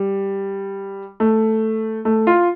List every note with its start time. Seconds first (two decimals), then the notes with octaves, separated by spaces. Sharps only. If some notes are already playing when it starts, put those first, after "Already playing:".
Already playing: G3
1.20 A3
2.05 A3
2.27 F4